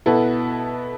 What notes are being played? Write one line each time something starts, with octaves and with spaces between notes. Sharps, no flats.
B2 B3 E4 A4